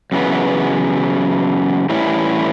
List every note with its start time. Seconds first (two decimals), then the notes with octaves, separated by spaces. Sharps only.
0.12 F#2 C#3 E3 B3
1.89 A2 E3 G3 C#4 E4